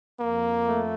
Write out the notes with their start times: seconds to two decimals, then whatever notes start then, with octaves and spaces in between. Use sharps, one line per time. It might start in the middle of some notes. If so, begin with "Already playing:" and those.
0.19 F2 A#3
0.65 A3